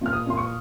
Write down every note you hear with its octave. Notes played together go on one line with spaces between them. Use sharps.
A#2 F6
D#6
A#2 C6
C#6